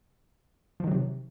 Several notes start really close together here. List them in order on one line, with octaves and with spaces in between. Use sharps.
F3 D#3 F#3 C3